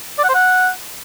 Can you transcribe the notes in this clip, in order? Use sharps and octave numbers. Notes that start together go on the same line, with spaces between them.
D5
F#5
C5
F#5